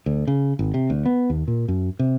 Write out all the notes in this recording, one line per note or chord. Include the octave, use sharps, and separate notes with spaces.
D2
C#3
G#1
C3
D2
B3
D#2
A#2
F#2
C3